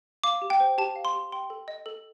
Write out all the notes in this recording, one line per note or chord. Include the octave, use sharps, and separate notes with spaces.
F5 D6
G4
G5
C5
G4 A5
F5
C6
G4
G5 C6
A4
D#5
A4